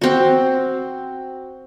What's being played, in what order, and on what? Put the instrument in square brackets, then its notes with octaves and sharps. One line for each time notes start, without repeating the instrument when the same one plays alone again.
[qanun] C4 F#4